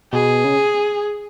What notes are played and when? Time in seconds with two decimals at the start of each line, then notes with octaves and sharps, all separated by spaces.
0.13 B2 G#4
0.44 C#3